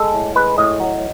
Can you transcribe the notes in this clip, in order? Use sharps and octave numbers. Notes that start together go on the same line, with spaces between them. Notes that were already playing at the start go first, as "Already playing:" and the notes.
Already playing: G#3 A4
A2
G#3 B4
A2 D#5
F#3